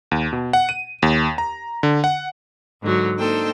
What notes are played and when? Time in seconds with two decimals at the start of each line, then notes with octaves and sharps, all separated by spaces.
0.11 D#2
0.33 B2
0.53 F#5
0.69 D#7
1.03 D#2
1.38 A#5
1.83 D3
2.04 F#5
2.81 G#2 D3 F#3
3.18 A#3 D4 D#4 A4 C5 G5